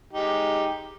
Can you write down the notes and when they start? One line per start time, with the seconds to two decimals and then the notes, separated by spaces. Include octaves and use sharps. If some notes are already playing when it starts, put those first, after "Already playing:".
0.13 G#3 D#4 G4